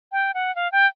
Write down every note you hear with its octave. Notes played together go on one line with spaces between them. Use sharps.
G5
F#5
F5
G5